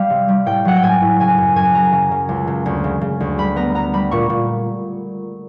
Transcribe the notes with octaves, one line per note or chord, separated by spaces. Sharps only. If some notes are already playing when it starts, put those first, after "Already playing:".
Already playing: G3 F5
C3
G3
A2 G5
F#3 F#5
G5
A2 G#5
A2
C#3 G#5
F#2
F#2 G#5
F#3 A#5
C#3
C#3
C#2
C#3
D2
C#3
C#3
D2
G3 B5
B3 A#5
B3 A#5
G3 B5
A#2 C#6
A#2